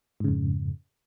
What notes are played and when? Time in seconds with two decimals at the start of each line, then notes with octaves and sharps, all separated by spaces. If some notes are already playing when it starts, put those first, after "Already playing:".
0.20 G#2
0.24 C#3
0.28 F2